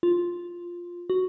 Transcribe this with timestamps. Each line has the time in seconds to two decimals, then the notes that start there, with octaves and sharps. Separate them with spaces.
0.03 F4
1.10 F#4